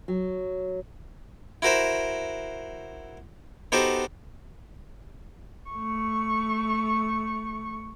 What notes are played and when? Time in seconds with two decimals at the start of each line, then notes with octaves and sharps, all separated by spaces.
0.08 F#3
1.62 E4 F#4 A#4 C5 E5
3.72 B3 D#4 F#4 G4 A4 C5
5.71 A3 C#6